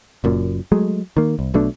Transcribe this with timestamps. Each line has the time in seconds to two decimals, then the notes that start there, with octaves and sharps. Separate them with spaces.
0.24 F#1 F#2 A#2
0.72 F#3 G#3 A3
1.17 D#3 A#3
1.39 C2
1.54 B1 B2 A3 D4